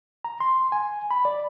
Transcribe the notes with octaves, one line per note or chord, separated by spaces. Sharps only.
A#5
C6
G#5
B5
D5